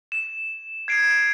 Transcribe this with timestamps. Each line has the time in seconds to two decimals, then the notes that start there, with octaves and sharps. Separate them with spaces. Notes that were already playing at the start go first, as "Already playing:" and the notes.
0.12 E7
0.88 G#6 C7 D7